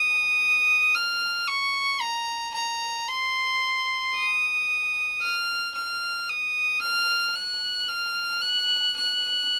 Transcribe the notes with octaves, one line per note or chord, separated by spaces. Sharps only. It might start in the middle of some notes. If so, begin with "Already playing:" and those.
Already playing: D#6
F6
C#6
A#5
A#5
C6
D#6
F6
F6
D#6
F6
F#6
F6
F#6
F#6